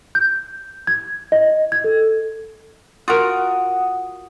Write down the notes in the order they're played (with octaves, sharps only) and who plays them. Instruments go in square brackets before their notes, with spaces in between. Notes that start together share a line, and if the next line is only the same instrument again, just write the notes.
[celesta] G6
G#6
D#5
G#6
A4
[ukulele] F4 F#4 A#4 [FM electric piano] F#5 D#6